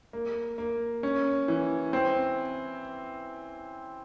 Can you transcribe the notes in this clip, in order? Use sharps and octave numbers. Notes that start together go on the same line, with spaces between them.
A#3
A#3
C#4
E3
C4